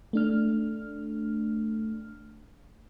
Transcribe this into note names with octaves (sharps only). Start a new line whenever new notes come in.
A3 D4 F6